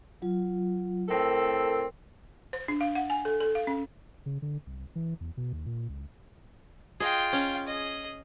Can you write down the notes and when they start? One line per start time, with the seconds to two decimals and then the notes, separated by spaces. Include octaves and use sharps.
0.22 F#3 F4
1.09 A2 C4 A4 A#4
2.53 C5
2.68 D4
2.81 F5
2.95 F#5
3.10 G#5
3.25 A4
3.41 A4
3.55 F5
3.67 C#4
4.26 C#3
4.42 D3
4.67 C2
4.95 E3
5.20 E2
5.37 B2
5.53 D#2
5.66 A#2
5.89 C#2
7.00 F4 G#4 D#5 G5
7.33 C#4
7.67 G#4 D#5